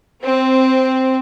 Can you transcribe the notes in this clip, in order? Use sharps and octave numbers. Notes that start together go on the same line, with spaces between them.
C4